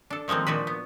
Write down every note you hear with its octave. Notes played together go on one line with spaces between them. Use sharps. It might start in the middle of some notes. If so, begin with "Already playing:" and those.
D4 A4
D#3 F3 G#3 A#3 C4
A#2 F3 D4 F#4 B4
B3